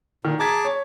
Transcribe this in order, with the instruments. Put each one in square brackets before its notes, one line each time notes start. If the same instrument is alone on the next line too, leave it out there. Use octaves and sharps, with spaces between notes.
[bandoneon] A#2 [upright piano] D#3
[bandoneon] G#4 A5 D6 [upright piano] A#5 G#6 B6
[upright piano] C#5